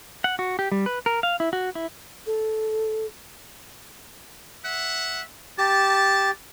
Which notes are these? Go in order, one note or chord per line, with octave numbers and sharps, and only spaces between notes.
F#5
F#4
G4
G3
B4
A#4
F5
E4
F#4
E4
A4
E5 F#5
G4 A5